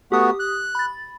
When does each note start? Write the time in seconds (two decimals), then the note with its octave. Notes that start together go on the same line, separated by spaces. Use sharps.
0.12 A3 B3 F#4 G4 D#6
0.39 F#6
0.75 B5 A6